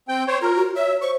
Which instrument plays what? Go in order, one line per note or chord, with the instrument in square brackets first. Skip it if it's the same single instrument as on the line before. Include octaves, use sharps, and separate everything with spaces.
[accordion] C4 G5
C5 C#5
[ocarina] F4 [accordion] A#4
[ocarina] F#4
[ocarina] C#5 [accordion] E5
[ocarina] C5 [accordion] C#6